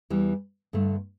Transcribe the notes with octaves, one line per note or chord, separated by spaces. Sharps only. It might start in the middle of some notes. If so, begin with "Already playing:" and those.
E2 E3 G3
G2 D3 A3